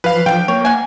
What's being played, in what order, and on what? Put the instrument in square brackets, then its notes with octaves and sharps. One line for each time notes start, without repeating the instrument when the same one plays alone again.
[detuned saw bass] F3 [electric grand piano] B4 F5
[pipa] D3 F4 [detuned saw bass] F3 [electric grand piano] G5
[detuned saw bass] A#3 [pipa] C#5
[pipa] F#5 G#5